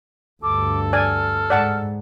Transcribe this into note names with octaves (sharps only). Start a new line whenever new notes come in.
D2 G2 A4 D6
D5 G#5 F6
G#2 D5 F#5 A5